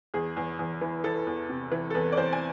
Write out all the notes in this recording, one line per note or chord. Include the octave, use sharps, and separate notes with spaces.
E2 G#4
E2
E2
E3
E3 A4
E2
C3
E3
A4
E2 B4
D5
E2 C5
G#5